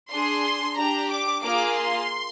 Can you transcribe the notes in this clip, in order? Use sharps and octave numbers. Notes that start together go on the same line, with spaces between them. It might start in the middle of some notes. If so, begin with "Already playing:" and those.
D4 G#4 C6
D4 G4 A#5
D6
A#3 F4 G#4 D6
C6